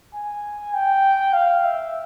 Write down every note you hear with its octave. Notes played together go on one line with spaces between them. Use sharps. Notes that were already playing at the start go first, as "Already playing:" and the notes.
G#5
G5
F5
E5